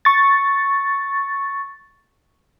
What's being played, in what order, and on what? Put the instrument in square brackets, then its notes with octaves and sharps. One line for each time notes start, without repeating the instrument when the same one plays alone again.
[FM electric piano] C#6 A6